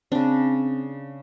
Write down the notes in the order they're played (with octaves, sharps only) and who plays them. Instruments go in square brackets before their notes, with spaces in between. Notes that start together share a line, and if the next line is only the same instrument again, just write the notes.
[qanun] C#3 D4 [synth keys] C4